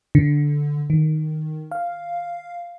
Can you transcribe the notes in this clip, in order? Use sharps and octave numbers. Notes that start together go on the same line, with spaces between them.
D3
D#3
F5